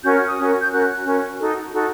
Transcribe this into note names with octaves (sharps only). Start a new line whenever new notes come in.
C#4 F#4 A#4 G6
F6
D#6
C#4 F#4 A#4
G6
C#4 F#4 A#4 F#6
C#4 F#4 A#4
D#4 F#4 A4
D#4 F#4 A4